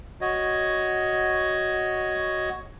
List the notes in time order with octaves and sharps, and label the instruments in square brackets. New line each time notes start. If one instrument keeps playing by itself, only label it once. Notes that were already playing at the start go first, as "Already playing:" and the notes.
[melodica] F#4 C#5 D#5